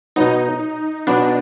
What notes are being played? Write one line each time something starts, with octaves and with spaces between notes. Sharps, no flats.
B2 F#3 B3 D#4
B2 F#3 B3 D4